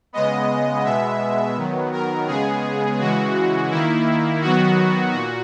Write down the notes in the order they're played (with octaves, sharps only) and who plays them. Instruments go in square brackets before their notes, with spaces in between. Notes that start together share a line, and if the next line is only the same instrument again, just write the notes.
[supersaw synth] C#3 G#3 B3 D#5
B2 G#3 B3 E5
D#3 F#3 B3
A#4
C#3 G#3 B3 G#4
C#3 E3 G#3 F#4
D#3 A#3 E4
D#3 F#3 B3 F#4
A#2 F#4